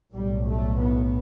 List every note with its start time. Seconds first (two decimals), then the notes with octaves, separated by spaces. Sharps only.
0.14 B1 A2 G3
0.48 A3
0.81 B3